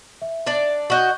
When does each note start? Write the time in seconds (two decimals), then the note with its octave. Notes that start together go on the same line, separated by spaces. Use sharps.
0.22 E5
0.46 D4 D5
0.90 F#4 D#5 C#6 F#6 G6